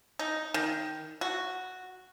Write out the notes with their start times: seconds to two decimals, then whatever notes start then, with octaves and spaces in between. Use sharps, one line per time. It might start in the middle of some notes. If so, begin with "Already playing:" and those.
0.19 D#4
0.54 D#3
1.21 F#4